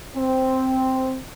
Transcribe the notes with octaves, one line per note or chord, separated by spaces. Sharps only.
C4